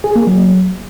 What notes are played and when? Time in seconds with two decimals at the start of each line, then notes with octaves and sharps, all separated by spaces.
0.04 G#4
0.16 A#3
0.27 F#3